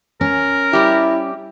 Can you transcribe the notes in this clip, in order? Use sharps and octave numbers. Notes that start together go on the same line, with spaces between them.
C#4 A#4
G3 E4 G4